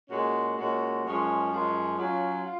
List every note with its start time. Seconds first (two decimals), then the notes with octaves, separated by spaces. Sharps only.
0.10 A#2 G#3 C#4 F#4
0.57 A#2 G#3 C#4 F#4
1.04 F#2 F3 G#3 C#4
1.51 F#2 F3 G#3 C#4
1.98 F#3 C#4 F4
2.45 F4